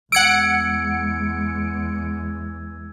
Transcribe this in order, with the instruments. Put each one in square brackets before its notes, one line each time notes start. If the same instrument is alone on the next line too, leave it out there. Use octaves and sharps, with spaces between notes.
[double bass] E2 G#3 [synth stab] F#5 C#7 D7 [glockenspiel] E6 G#6